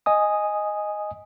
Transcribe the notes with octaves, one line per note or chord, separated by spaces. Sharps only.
D#5 G#5 D#6